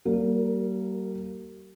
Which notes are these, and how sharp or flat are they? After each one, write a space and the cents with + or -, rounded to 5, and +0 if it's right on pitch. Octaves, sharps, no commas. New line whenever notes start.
G3 -45 A#3 +0 A#4 -30